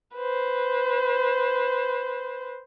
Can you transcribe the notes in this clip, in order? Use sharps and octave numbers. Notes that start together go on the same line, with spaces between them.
B4 C5